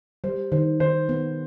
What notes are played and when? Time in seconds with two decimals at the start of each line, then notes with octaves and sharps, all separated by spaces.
0.24 G3 C5
0.52 D#3 C5
0.80 D#3 C5
1.09 B3